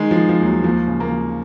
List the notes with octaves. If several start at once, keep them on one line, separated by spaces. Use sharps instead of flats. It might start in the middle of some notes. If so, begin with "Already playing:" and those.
Already playing: D#3 G#3
F3
D#3
F3
D#2
F#3
D#2 F3
C#3
A#3
F3